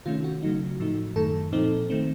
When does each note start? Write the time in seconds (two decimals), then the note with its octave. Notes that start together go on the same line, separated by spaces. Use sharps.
0.06 C3 D#3 A3 C#4 F4
0.24 F#4
0.42 C#3 F#3 A3 D#4
0.80 A2 F3 A3 D#4
1.16 F#2 D#3 A3 A4
1.52 A#2 F3 C4 D#4
1.90 D#3 A3 C4